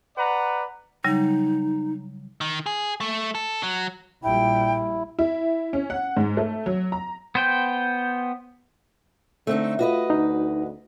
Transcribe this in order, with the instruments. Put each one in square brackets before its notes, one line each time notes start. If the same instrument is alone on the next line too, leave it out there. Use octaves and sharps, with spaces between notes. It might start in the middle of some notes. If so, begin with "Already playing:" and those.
[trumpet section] B4 D5 F#5 A#5
[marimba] C#3 F#3 G3 [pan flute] D#4
[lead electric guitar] D#3
G#4
A3
A4
F#3
[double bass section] A#1 A#2 G3 [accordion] E4 [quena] G5
[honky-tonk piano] E4
C#4
F#5
G#2
A3
F#3
A#5
[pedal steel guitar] B3 C5 G5
[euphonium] D3 [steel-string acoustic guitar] A3 C4 D#4
[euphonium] F4 [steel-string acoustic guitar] F#4 B4 D#5
[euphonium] D2 [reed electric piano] D#4